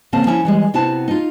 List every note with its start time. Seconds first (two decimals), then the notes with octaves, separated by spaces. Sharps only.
0.13 E2 C#3 A#3 C4 A5
0.26 F3 C#4 E4
0.45 E3 G3 G#3
0.74 C3 B3 E4 F#4 C5 A5
1.08 D#4 F4